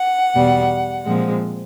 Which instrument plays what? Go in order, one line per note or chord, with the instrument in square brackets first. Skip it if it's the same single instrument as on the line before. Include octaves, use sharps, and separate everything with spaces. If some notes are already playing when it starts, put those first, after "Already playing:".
Already playing: [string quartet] F#5
E2 B2 G3
A#2 F3 G#3 C4